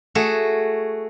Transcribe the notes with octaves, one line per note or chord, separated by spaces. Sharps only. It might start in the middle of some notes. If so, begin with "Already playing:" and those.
A3 F#4 G#4